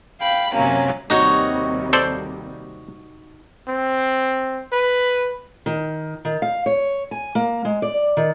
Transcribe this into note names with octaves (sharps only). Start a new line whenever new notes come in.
F5 G5 B5
F#2 C3 F#3 A#3 C#4
D#2 C3 G3 D#4 F#4 C#5
A4 C5 D5
C4
B4
D#3
D#3
F5
C#5
G#5
A#3
G#3
D5
D#3